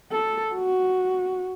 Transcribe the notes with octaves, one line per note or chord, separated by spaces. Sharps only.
A4
F#4